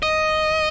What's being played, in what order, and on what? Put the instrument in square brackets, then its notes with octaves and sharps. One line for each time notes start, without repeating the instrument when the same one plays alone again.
[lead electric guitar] D#5